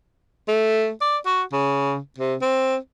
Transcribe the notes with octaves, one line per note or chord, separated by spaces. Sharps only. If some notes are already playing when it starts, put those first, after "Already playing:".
A3
D5
F#4
C#3
C3
C4